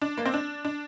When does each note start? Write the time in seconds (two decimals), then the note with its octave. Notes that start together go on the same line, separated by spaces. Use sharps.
0.02 D4
0.17 A#3
0.25 C4
0.34 D4
0.65 D4